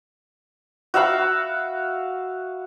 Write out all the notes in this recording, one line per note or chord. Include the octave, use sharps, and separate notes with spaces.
F#4 E5 F5 B5